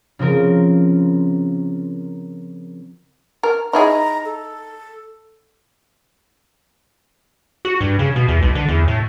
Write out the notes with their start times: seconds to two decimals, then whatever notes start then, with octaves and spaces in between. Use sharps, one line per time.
0.19 C#3 F3 C4 A#4
3.43 A#4
3.73 D#4 E4 G#4 A#5
4.25 A4
7.65 F#4
7.81 G2
7.99 C#3
8.16 B2
8.28 E2
8.43 B1
8.55 D3
8.68 E2
8.88 A2